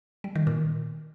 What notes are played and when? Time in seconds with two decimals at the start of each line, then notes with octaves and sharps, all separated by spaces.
0.24 G3
0.35 D#3
0.47 A#2